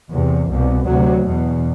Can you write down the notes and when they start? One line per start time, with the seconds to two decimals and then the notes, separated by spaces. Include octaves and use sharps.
0.11 E2 C3
0.48 C2 B2
0.86 D2 C3 F#3
1.24 E2 B2